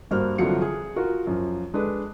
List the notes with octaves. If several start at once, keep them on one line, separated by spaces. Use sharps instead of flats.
G2 A#3 F#4 C5 F6
C2 D3 F3 F#3 C#7
G#4
F4 F#4 A#4
F#2 F3
G#3 D4 A4 B4